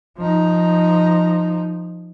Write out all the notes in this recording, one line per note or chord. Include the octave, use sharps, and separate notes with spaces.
F3 D#4